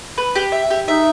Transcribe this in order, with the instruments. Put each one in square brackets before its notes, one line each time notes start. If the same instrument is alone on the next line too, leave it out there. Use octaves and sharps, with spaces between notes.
[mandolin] B4
G4
E5
G4
[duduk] D#4 [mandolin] E5